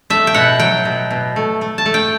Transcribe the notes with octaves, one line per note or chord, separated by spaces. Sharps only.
A3 E5
G5
B2 F#5
F#3 G5
B2
B2
A3
A3
A5
A3
G5